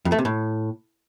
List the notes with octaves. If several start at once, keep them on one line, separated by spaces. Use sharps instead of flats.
F2
A3
C3
A2